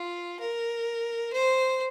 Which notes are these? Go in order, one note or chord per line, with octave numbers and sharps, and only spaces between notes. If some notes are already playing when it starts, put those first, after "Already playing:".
Already playing: F4
A#4
C5